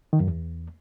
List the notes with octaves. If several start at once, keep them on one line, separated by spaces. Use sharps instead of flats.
D#3
F#2
E2